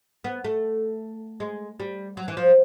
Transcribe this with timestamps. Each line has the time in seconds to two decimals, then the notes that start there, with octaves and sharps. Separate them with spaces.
0.24 B3
0.44 A3
1.40 G#3
1.80 G3
2.17 F#3
2.28 E3
2.37 F3